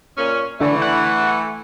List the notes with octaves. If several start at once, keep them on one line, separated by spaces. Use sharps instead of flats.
A#2 C#4
D3 E3 A3
F#5